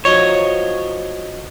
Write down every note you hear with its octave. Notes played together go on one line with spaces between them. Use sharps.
F3 F#3 D#4 C#5